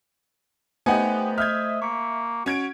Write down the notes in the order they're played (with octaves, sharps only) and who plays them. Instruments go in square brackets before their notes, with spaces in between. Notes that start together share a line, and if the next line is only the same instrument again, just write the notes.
[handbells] A3 C5 [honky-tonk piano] B3 D#4 G4 [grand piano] F#5 G#5
[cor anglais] D#5 [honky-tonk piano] E5 G#6 [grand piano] F6 G6
[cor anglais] A#3 [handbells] C#6 C#7
[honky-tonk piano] C#4 G#6 D7 [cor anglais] F#4